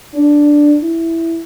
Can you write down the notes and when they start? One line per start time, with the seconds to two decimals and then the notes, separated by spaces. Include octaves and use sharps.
0.14 D4
0.83 E4